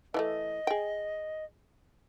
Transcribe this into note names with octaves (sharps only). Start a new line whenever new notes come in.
E3 F3 A3 D#5
G#4 G5